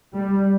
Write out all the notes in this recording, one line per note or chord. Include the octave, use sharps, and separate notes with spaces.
G3